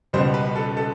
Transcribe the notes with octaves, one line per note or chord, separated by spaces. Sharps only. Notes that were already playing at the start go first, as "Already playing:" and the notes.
C#2 B2 G3 B3 C5
B4
A4
A4